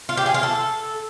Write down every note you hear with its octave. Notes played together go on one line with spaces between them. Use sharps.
F4
G4
G#4
F4
A4